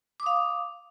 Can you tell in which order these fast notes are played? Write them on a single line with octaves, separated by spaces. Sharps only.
D6 D#6 F5